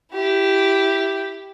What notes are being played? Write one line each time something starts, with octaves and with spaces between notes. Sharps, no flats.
E4 G4